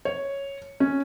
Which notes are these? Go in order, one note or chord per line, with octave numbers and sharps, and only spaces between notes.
C#5
C#4